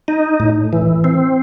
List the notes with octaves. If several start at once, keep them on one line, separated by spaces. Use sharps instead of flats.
D#4
A2
E3
C4